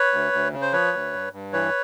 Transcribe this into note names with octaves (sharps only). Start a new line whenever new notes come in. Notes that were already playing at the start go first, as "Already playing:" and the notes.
Already playing: B4 C#5
D2
D2
C#3
C5
F3 B4 C#5
D2
G2
G2
E3 B4 C#5